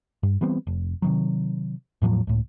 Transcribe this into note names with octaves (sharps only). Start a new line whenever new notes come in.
G2
E3 G3 B3 C4
F1
C3 D#3 F#3
E2 A2 F3 F#3
C#2 A2